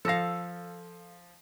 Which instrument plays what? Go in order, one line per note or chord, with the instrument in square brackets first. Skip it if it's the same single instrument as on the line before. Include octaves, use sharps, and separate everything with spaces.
[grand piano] F3 A#6 [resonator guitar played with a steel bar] A4 F5